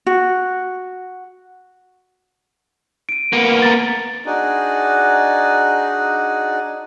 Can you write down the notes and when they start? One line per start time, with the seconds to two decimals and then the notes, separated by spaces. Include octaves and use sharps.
0.06 F#4
3.09 D7 D#7
3.33 A#3 B3
3.62 A#5 A6
4.26 D4 D#4 F#4 G#4